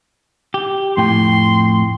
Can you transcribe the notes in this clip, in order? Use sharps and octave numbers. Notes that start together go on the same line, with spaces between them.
G4
F2 A2 G5 C6